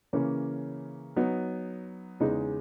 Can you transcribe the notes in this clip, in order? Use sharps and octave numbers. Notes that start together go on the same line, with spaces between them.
C#3 E3 A#3 C#4
F#3 B3 D#4
E2 C#3 G#3 D#4